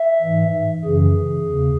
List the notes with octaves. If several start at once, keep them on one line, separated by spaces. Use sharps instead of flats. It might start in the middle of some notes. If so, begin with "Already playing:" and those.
Already playing: E5
G#2 E3
F#2 C#3 E3 G#4
E2 C#3